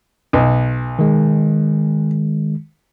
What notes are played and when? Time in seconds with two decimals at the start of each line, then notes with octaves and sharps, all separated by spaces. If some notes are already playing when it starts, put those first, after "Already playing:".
0.33 B1
0.99 D#3 G#3